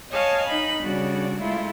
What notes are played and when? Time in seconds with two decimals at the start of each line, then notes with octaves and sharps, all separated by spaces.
0.11 C#5 D#5 F5 G#5 A5
0.47 D#4 D#5 B5
0.84 C#3 G3 D4 F#4
1.40 G#3 A3 E4 F4